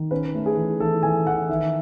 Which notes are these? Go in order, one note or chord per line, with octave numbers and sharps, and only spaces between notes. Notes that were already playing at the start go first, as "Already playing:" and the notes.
Already playing: D#3
C#4 B4
A3
G#4
E3
E3 A4
E3 G#5
E3 F#5
D#3 E5